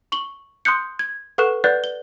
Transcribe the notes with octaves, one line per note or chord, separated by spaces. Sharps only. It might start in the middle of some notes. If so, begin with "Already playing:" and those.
C#6 F#7 G7
C6 D#6 F#6 G6 C#7
G#6
A4 B4 F#5 C#6 F#6 E7
B4 D5 F#5 F#6 G6 A6
G7